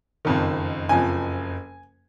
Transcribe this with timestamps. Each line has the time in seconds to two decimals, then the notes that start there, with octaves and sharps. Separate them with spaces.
0.25 F#1 F2 D#3
0.89 F#1 F2 F3 G#5